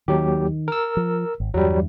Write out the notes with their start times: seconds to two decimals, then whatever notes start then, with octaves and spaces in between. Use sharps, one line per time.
0.08 D#2 D#3 F#3 G4
0.68 A#4 E6
0.97 F3
1.40 G#1
1.54 E2 G2 F#3 G3